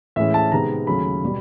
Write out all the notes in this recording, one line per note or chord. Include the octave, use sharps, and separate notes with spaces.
A2 E3 G#3 C#4 E5
A5
C3 D#3 G#3 B3 A#5
D#2 C#3 F#3 A3 C#4 B5
B2 G3